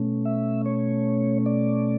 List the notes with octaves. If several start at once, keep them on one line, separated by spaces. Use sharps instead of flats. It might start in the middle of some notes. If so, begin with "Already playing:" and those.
Already playing: B2 A3 C#4
E5
C#5
D5